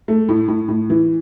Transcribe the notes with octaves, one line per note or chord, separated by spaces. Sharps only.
A3
A2
A2
A2
E3